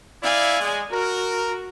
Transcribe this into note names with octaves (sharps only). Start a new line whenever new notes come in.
E4 D5 F5 G#5
G#3
F#4 A#4